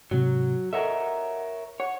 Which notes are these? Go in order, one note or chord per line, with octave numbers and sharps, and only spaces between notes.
G#2 C3 F#3
A4 A#4 C#5 D#5 E5 F#5
C#5 F#5